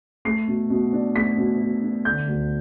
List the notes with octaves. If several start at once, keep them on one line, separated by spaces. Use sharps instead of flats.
A3 C7
B2
B2
D4
A3 B6
B2
B2
D4
D3 G6
D2